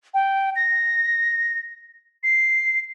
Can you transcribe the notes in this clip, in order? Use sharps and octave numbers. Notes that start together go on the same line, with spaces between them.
G5
A#6
C7